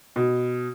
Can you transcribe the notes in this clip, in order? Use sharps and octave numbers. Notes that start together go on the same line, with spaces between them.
B2